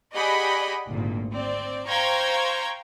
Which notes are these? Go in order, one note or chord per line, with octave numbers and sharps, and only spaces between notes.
G4 G#4 D5 D#5 F#5 B5
G#1 D2 A#2
C4 D5
C5 F5 G5 A#5 C#6 G#6